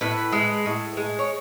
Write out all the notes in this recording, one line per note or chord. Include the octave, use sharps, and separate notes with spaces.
A2 B4
G#3
A2
G#3
C#5